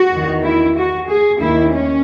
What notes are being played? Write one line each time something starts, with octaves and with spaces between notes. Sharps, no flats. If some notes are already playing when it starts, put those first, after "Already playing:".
Already playing: F#4
E2 D#3
E4
F#4
G#4
D#2 D#3 E4
C#4